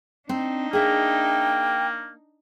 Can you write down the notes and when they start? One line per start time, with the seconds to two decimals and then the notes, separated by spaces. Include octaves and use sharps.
0.29 C4 D4 D#4
0.73 A#3 G#4 E5 G5